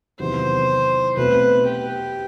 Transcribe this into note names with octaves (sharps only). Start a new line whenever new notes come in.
E2 C3 D#3 F#3 B3 C5
B2 A3 C4 F#4 B4
G4